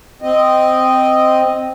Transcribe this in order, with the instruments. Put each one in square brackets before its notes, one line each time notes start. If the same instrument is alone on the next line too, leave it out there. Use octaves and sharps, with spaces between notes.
[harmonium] C4 D#5